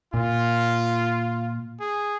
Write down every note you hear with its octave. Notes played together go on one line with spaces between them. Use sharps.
A#2 F4
G#4